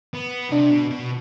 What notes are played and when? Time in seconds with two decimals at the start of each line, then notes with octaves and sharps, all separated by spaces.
0.14 B3
0.52 C3 D4
0.71 B2
0.90 B2